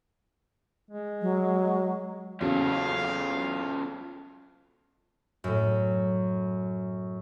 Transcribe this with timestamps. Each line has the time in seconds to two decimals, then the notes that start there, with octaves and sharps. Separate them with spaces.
0.91 G#3
1.21 F#3
2.41 E2 C#3 F#3 C#4 F4 A4 F5
5.44 F#2 A2